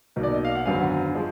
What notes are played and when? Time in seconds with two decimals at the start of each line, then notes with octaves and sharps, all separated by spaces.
0.16 B1 B2 A#3 D#4
0.23 D5
0.34 D#5
0.45 F5
0.55 F#5
0.65 G#1 F#2 D3 F#3 B3 F5 G#5
1.15 F3 G#3